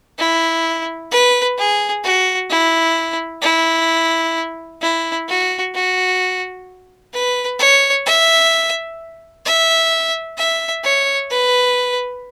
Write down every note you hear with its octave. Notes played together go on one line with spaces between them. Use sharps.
E4
B4
G#4
F#4
E4
E4
E4
F#4
F#4
B4
C#5
E5
E5
E5
C#5
B4